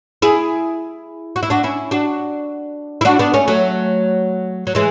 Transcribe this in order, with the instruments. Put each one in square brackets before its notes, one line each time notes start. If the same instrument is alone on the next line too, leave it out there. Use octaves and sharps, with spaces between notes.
[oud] E4 G#4
F#4
E4
D4 F#4
C#4 E4
D4 F#4
E4
D4 F#4
B3 D4
A3 C#4
F#3 A3
F#3
E3 G#3